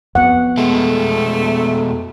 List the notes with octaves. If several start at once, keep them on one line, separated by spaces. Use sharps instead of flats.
F2 B3 F#5
B2 G#3 A3